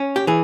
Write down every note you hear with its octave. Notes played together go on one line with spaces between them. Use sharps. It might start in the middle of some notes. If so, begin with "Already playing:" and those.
Already playing: C#4
G4
E3 G#4